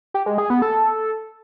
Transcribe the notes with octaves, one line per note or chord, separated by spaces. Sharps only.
G4
G#3
G#4
B3
A4